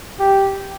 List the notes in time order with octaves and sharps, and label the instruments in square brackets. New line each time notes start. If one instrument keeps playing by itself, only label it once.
[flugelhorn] G4